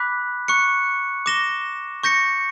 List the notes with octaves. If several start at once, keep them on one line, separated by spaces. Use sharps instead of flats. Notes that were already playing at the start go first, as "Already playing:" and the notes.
Already playing: B5 D6 F#6 B6
C#6 F#6 C#7
D6 A#6 E7 G7
C#6 G6 A#6 C#7